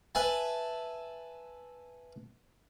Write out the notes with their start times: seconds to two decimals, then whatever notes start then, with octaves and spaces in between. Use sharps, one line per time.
0.15 B4 E5 G#5 A5